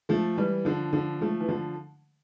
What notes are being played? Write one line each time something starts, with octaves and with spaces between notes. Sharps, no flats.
F3 A3
E3 G3
D3 F3
D3 F3
F3 A3
E3
D3 F3